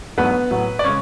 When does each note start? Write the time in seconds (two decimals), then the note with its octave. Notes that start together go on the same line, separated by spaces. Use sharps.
0.17 G#2 F#3 A3 B3 D4 B4
0.51 A2 F#3 B3
0.79 D5
0.84 C#3 G#3 C#4 C#5